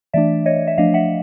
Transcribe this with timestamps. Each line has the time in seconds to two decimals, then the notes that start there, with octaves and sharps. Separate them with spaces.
0.14 E3 A3 D4 D5 E5
0.46 C#5 D#5
0.67 E5
0.78 F3 A3 D4 D#5 F5
0.94 E5 F#5